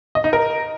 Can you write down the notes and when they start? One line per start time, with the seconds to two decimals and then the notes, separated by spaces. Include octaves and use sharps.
0.15 D#5
0.24 D#4
0.33 A#4